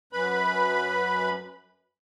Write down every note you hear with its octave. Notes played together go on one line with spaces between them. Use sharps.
F#2 B4 B5